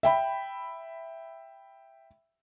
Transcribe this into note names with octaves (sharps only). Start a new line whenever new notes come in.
E5 G5 B5